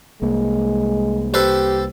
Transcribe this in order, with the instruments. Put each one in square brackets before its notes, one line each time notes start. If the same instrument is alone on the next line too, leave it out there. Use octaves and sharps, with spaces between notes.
[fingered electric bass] C2 A#3 [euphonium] G#3
[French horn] G4 [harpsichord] A4 B4 C5